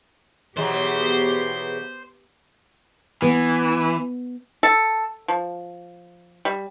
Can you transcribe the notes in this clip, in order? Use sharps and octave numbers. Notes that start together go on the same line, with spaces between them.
B2 E3 F#3 B3 G4 G#4 C5
E3 B3
A4
F3
G3